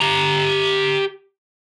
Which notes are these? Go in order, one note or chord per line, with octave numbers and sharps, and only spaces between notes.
G4 A#5